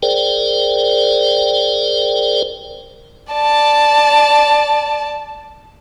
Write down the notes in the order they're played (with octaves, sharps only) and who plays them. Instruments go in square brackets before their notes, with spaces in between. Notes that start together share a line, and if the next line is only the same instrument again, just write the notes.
[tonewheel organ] G#4 A#4 C5 D5 G5
[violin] D5 A5